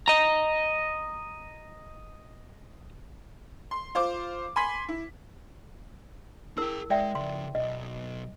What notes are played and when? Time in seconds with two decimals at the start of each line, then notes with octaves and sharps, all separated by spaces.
0.08 D#5 A#5
3.71 C6
3.95 F4 C5 D6
4.56 G#5 B5 C6 B6
4.89 E4
6.58 E4 G#4 A#4 G5 E6
6.90 G#3 D5 E5 G5
7.15 C#3 F3 C6
7.55 B1 D#5